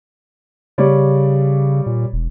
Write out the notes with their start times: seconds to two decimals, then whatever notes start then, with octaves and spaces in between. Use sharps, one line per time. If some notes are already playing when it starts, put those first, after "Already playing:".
0.78 C#3 G3 C#5 D5
1.86 A#2
2.13 E1